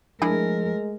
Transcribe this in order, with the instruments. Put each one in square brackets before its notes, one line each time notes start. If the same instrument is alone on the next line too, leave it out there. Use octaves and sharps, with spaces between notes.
[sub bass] F3 [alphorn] G#3 [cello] A3 A#4 [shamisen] D4 E4 G#4